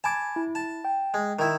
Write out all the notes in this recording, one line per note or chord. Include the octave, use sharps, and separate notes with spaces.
G#5 A5 B5 D6 G#6
E4
A5
G5
G#3
D#3 E4